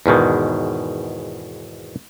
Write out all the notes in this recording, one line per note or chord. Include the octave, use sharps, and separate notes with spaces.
E2 G#2 B2 D#3